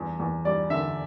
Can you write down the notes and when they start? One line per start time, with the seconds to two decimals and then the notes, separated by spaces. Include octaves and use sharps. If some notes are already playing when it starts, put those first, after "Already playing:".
Already playing: E2 G2
0.20 E2
0.45 G3 D5
0.70 D3 E5